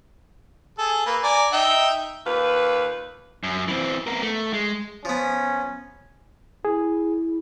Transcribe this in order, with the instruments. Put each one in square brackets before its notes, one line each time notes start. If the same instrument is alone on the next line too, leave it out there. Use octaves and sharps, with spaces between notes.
[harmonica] G#4 A4
A#3 B4
D5 G#5 A#5
D#4 E5 G5
[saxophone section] D#2 F4 B4
[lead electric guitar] F#2
E3 C4
B3 A#4
A3
G#3
[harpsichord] F3 B3 [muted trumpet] C#4
[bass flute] E4 [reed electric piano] G#4